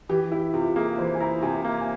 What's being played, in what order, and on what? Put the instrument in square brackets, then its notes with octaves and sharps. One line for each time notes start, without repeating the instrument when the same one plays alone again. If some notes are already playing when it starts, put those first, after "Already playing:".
[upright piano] E3 [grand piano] G4
[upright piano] E4 [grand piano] G4
[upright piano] C3 [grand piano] F4
[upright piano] A#3 [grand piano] G#4
[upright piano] E3 [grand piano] C5
[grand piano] G#5
[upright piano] E4 [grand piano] A#5
[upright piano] C3 [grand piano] G#5
[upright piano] A#3 [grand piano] F5
[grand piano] G#5